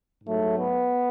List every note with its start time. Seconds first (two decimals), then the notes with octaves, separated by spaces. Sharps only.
0.24 G#2 F#3 A3
0.55 B3